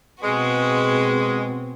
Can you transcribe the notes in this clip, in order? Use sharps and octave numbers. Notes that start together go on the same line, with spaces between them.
B2 G#3 C4 F#4 B4